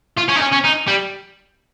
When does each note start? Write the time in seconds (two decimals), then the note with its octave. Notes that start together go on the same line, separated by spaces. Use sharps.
0.17 F4
0.28 C#4
0.35 D#4
0.41 C#4
0.52 C#4
0.64 D#4
0.87 G3